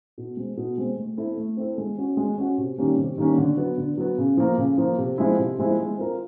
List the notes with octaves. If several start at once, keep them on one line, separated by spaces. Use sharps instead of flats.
B2
G#3 C4
B2
G#3 C4
A3
C4 E4 A4
A3
C4 E4 A4
G#3
C#4 F#4
G#3
C#4 F#4
C3
D#3 G3 A#3 C#4
C3
D#3 G3 A#3 C#4
D3
F#3 B3
D3
F#3 B3
C#3
F3 A#3
C#3
F3 A#3
C3
F3 G#3 C4 E4
C3
F3 G#3 C4 E4
G#3
C4 F4 A#4